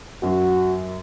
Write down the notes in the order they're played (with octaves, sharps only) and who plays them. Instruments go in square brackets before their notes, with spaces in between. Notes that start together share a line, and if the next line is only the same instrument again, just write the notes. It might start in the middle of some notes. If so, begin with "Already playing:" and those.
[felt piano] F#2 F#3 [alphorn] F#4